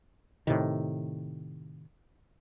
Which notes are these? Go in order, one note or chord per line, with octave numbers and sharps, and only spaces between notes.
A2 C3 D#3